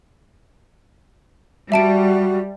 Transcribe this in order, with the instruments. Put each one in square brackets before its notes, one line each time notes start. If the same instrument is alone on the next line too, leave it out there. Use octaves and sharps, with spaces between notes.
[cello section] G3 [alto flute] F#4 [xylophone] E5 A5 D7